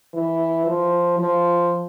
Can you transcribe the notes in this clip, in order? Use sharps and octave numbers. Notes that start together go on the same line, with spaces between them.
E3
F3
F3